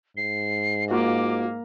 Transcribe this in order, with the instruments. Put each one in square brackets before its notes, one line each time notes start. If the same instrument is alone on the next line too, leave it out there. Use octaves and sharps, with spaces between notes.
[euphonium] G#2 [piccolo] C7
[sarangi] A#3 [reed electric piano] F4 F#4 [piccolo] D6